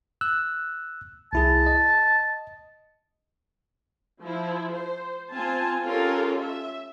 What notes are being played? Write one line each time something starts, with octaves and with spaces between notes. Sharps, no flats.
E6 F#6
C2 E4 G#4 A5
D#5
F3 E4
C5
C4 F4 G#5 A5
C#4 F4 G4 A4 A#4
E5